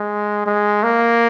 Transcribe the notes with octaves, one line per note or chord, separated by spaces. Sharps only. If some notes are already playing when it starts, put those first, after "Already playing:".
Already playing: G#3
G#3
A#3